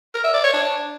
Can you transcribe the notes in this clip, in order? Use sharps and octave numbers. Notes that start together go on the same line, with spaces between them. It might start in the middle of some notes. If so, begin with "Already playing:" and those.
A#4
E5
D5
C#5
D4